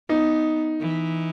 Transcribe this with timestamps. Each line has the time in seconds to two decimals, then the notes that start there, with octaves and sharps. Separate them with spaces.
0.09 B3 D#4
0.80 E3